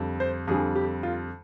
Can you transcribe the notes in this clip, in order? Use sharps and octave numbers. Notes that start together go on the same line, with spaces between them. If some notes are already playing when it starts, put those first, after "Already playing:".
Already playing: F2 D3 G3
C5
F2 D3 G3 G#4
G4
F4